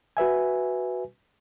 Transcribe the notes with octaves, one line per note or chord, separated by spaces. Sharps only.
F#4 B4 E5 G#5